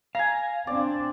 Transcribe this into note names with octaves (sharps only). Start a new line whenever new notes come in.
F5 G#5 A#5
C4 D4 D5